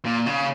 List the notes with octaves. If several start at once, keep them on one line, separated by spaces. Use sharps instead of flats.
A#2
C#3